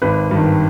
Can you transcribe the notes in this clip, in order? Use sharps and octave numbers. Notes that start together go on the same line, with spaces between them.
G#1 B4
G2 D#3